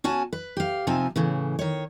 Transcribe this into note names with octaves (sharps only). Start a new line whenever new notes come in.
C#4 F#4 G#5 A5
B4
G4 F5
C3 F3 C4 D#4 G#5 A5
A2 C#3 E3
D#3 C#5